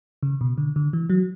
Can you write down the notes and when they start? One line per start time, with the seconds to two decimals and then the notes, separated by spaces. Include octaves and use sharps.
0.23 C#3
0.41 B2
0.58 D3
0.76 D3
0.93 E3
1.10 F#3